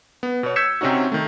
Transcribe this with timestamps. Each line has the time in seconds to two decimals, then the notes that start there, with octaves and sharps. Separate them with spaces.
0.23 B3
0.43 B2 C#5
0.56 E6 G6 G#6 B6 C#7 E7
0.81 C3 C4 C#4 D#4 F#4
1.12 D#3 A3